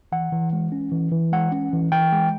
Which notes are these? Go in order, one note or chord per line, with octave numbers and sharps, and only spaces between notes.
E3 F#5
E3
G#3
C#4
E3
E3
G#3 F#5
C#4
E3
E3 G5
G#3